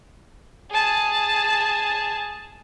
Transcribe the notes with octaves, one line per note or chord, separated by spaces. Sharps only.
G#4 A5